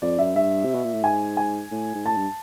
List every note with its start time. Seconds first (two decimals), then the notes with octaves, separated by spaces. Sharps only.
0.02 F2 D5
0.19 F#2 E5
0.36 G2 E5
0.64 C3
0.74 B2
0.84 A#2
0.94 A2
1.03 G#2 G#5
1.37 G#5
1.71 A2
1.95 G#2
2.06 A2 A5
2.17 G2